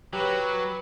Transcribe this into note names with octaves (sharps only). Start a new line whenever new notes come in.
F#3 G4 B4